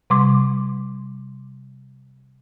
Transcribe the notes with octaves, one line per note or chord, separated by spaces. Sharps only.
C3 G3 C6 D6